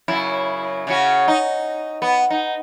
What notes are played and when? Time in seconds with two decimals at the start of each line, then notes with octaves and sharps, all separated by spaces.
0.08 F#2 C#3 E4
0.87 C#3 C#4 F#4
1.28 D#4
2.02 B3
2.30 D#4